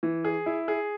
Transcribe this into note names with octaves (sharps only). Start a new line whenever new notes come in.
E3
G#4
E4
G#4